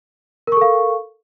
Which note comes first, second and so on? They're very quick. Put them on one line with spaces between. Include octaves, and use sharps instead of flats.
A#4 C#6 A4 F5